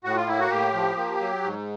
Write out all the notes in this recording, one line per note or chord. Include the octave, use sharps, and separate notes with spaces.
A2 F#4
F4
A#3 E4
F#4
A2 G4
F3
A#3
F#3
G#2